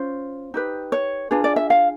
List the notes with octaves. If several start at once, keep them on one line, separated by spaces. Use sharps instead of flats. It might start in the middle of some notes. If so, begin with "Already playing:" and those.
Already playing: C#4 F4 C5
D#4 G4 B4
C#5
D4 F4 G#4 B4
D5
E5
F5